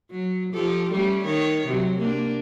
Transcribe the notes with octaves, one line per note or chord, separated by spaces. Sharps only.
F#3
F3 G4 A4
G3 A3 C#4
D#3 C#5
C3 F#3
A#3 D4